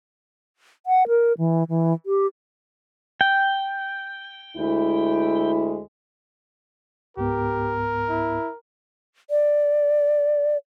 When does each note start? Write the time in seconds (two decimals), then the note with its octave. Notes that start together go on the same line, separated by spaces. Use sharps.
0.86 F#5
1.08 A#4
1.38 E3
1.69 E3
2.06 G4
3.21 G5
4.56 D2 G#3 E4
7.17 C#2 G#2 B3 G4 A#4
8.10 E4
9.30 D5